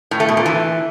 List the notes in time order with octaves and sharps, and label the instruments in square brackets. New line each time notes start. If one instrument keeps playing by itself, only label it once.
[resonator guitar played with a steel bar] A2
A3
B2
A#2
E3